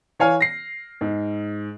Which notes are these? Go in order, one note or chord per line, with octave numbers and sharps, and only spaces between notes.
E3 C#5 F5 G#5 F6
A#6 C7
G#2